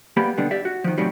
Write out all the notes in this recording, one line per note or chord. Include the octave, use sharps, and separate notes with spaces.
G3 A#3 B3 G4 B5
B2 D3 G3 B3 D4
G4 D5 E5
F#4
D#3 F3
A2 C3 D#3 F#3 G3 C#4